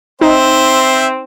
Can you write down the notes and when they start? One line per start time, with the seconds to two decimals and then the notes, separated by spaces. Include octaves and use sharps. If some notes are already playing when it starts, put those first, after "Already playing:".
0.21 C4 D#4 C5 E5